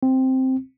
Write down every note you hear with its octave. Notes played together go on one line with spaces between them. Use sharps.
C4